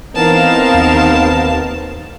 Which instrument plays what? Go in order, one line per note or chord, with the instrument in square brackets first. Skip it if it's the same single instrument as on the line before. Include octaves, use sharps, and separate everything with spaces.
[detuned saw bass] E3 [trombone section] B3 C4 [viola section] D#4 A#4 F5 [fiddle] A5
[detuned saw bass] D#2